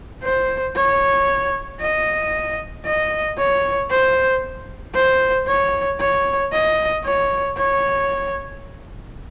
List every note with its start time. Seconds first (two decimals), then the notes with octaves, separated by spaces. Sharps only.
0.23 C5
0.76 C#5
1.81 D#5
2.86 D#5
3.38 C#5
3.90 C5
4.95 C5
5.47 C#5
6.00 C#5
6.52 D#5
7.05 C#5
7.57 C#5